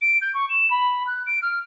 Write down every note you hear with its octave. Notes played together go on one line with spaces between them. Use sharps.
D7
G6
C#6
E7
B5
F#6
D7
F6